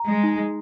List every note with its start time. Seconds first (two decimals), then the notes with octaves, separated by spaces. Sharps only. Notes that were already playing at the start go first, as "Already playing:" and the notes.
Already playing: A#5
0.09 G#3
0.23 D#4